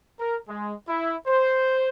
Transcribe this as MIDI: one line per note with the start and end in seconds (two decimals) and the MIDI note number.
0.19 0.37 70
0.49 0.72 56
0.88 1.16 64
1.27 1.89 72